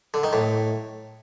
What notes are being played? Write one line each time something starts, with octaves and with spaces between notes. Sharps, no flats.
D3
D#3
A2